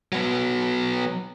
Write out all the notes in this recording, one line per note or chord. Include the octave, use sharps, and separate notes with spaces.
F#3 B3